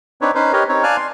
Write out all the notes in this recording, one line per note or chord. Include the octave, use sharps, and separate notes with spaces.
C4 D4 D#4 B4 C#5
C#4 D#4 B4 C5
G4 A#4 B4 C#5 D#5
C4 D#4 C#5
D5 F5 G#5 A5 F6 F#6
C6